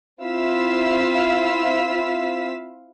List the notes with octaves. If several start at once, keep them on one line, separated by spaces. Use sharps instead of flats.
C4 E4 F4 F5 E6 B6